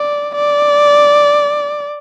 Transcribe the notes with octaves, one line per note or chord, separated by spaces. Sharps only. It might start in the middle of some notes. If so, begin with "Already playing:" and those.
Already playing: D5
D5